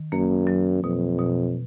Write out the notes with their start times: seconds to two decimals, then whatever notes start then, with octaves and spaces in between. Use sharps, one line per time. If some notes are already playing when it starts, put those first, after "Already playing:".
Already playing: D#3
0.12 F#2 A#3
0.47 F#3
0.84 F2 B2
1.19 B2